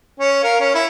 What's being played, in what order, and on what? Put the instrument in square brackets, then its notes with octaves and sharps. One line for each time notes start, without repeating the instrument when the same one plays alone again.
[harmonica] C#4
A#4 F5
C#4
E4